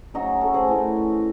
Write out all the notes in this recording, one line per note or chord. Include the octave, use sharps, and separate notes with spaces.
C#3 F#3 C#4 D#4 F#4
F#4 A4
G#4 C5
A2 E3 A3 C#4